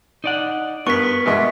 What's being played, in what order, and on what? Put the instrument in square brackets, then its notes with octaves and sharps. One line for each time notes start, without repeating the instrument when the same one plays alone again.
[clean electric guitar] D#4 D5 F#5
[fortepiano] G2 [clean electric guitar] B3 [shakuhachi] A#4 [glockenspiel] C#6 B6
[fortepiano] G2 B2 G#3 [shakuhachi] E5